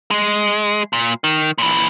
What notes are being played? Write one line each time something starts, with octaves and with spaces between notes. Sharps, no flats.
G#3
A#2
D#3
A#2 E3